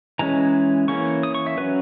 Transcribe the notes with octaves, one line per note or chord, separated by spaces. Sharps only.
E3 G#3 C#4 A#5
E3 A#3 C#4 C#6
D#6
C#6
E5
F#3 C#4 B4